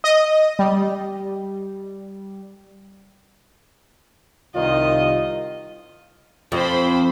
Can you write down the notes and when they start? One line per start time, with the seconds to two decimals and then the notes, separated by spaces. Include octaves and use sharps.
0.04 D#5
0.59 G3
4.56 C2 D#3 F4 D#5
6.52 F2 C5 G5 B5